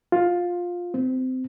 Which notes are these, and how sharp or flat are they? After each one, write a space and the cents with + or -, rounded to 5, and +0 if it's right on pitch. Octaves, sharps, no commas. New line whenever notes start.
F4 +15
C4 -25